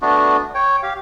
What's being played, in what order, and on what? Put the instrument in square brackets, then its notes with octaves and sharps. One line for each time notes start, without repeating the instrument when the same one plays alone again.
[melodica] A3 B3 D4 F#4
C#5 G5
G4 F5